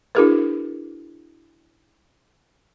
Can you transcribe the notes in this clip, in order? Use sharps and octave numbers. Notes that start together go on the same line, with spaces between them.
D4 E4 F#4 G#4 A#4 B4